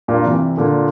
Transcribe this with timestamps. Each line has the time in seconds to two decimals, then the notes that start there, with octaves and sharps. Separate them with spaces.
0.08 G2 A#2
0.25 C3 E3
0.57 A#2 D3